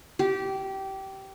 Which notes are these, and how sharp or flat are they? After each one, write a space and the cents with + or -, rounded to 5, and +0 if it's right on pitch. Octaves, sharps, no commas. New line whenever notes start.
G4 -20